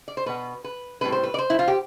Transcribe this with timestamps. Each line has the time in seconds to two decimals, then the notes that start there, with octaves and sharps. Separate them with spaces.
0.08 D5
0.17 C5
0.26 B2 B3 B4
0.64 B4
1.01 A2 G3 C4 B4
1.12 C5
1.23 B4
1.34 D5
1.38 C5
1.50 E4
1.59 F4
1.68 G4